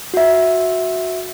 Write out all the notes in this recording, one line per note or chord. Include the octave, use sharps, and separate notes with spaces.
F#4 E5